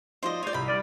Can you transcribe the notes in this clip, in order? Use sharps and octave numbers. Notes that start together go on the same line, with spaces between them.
F3 D#4 C5 D5 D#5
C#5 D5 G6 C7 D#7
C2 B5
G3 D5 F6 D#7